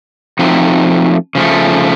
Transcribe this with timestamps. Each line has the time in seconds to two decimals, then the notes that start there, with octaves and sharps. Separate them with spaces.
0.39 F3 A3 C4 D#4 F#4
1.35 C#3 F3 A3